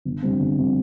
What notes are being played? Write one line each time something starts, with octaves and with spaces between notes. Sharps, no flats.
G1
F2 D3 G3 C4
G1
F2 D3 G3 C4